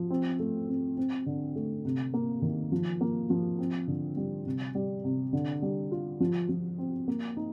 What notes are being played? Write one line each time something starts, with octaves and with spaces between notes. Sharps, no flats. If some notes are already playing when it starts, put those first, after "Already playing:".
Already playing: F3
C4
A3
C4
C4
D3
A3
C3
A#3
D#3
F3
A#3
F3
C4
D3
G3
C3
G3
C3
D3
G3
F4
F3
F3
C4
A#3
D#4